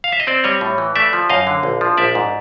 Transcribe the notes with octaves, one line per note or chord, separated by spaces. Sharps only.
F5
E5
D#5
C4 C5 D5
G3 C#5 D#5
A2
E3
A3 D5 E5
F3
F#2 D#5 F5
D3
A#1
F3
A#1 D5 E5
G#2